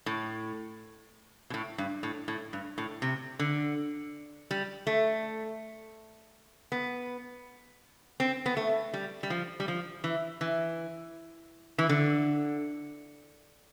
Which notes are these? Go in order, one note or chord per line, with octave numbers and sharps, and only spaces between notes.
A2
B2
A2
G2
A2
A2
G2
A2
C3
D3
G3
A3
B3
C4
B3
A3
G3
G3
F3
G3
F3
E3
E3
E3
D3